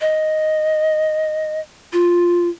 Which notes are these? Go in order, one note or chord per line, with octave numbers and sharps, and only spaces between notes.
D#5
F4